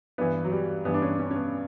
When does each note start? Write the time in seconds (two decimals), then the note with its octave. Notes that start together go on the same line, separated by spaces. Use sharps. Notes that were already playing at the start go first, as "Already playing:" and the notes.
0.18 G2 E3 B3
0.44 F#3
0.52 G3
0.85 G2 E3 B3
0.94 D4
1.02 C#4
1.19 C#4
1.31 C#4
1.35 B3